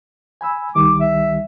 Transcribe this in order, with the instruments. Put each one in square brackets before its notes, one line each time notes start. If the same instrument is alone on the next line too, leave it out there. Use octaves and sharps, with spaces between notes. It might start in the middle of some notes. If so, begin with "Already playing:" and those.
[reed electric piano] G#5 B5 E6
[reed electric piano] C2 D#3 G3 [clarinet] D6
[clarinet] E5